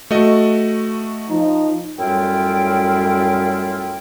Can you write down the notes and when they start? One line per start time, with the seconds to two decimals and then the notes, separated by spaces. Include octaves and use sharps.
0.11 A3 F#4 D#5
1.29 F3 D#4
1.98 F#2 A2 G3 E4 F4 G5